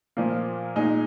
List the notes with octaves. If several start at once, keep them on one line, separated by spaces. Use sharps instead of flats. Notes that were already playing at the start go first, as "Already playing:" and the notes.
A#2 F3 A#3
A#2 G#3 D#4 G#4